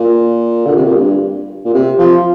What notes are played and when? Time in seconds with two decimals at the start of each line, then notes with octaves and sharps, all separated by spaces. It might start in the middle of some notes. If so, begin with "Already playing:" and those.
Already playing: A#2
0.66 D3
0.76 C3
0.86 A#2
0.96 G2
1.65 A#2
1.74 C3
1.98 F3